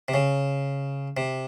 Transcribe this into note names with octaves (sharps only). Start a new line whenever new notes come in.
C3
C#3
C3